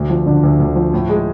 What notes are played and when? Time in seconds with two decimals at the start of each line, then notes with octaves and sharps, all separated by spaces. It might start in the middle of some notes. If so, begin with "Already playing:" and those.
Already playing: D2
0.10 F3
0.26 D3
0.43 D2
0.60 D2
0.76 F3
0.93 A2
1.09 G#3